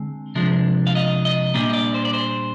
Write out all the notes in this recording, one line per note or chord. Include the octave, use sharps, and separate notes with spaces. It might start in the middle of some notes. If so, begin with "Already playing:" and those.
Already playing: D3 G#3 C4
C3 F3 G#3 D4
F5
D#5
D#5
A#2 G3 A#3 D4 D#5
D#5
D5
C5
D5
C5